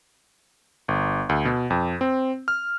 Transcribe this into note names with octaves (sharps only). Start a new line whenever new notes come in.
G1
D2
B2
F2
C4
F6